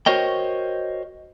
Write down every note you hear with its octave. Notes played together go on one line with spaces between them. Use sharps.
F#4 A#4 C5 C#5 D#5 G5